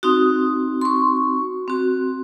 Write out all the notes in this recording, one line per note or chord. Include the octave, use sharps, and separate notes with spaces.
C4 D#4 F#4 D#6
C6
C#6
C4 F#4